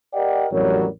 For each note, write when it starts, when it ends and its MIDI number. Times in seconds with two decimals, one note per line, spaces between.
0.14 0.47 67
0.14 0.47 70
0.14 0.47 74
0.14 0.47 75
0.14 0.47 78
0.14 0.47 79
0.52 0.86 33
0.52 0.86 41
0.52 0.86 54
0.52 0.86 55
0.52 0.86 70
0.52 0.86 73